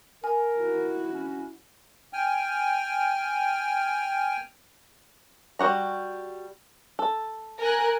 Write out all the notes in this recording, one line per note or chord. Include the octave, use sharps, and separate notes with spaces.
A#4 G#5
E4 F#4
C#4
G5 G#5 F6
G3 F#4 A#5
A4
A#4 G#5 F#6